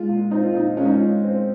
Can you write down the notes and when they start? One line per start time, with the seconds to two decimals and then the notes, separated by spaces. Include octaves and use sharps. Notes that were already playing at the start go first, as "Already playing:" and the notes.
Already playing: G#3 F4
0.09 A#2
0.31 C4 D#4
0.43 F4
0.54 A#2 D#4
0.77 G#3 C#4
0.85 D#4
0.93 C#4
1.01 A#2
1.23 C4